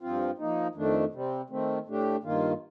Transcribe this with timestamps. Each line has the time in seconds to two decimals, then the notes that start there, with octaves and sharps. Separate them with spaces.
0.01 G2 F3 C4 F4
0.38 F3 A#3 D#4
0.75 F2 D#3 A3 D4
1.12 C3 G3 C4
1.50 D#3 A3 C4
1.86 A2 A3 D4 G4
2.23 G2 D#3 A#3 F4